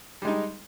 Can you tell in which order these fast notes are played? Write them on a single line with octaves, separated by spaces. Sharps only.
G3 G#3 D#4